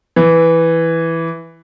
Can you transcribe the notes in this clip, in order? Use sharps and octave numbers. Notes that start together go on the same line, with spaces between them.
E3